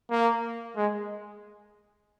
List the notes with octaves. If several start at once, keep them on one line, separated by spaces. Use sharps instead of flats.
A#3
G#3